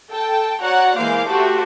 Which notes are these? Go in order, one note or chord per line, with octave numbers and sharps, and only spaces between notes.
A4 G5 A5
F#4 C#5 D5 F#5 A#5 F#6
E3 G#3 A#3 C5 F5 D6
A3 F#4 G4 A4 C5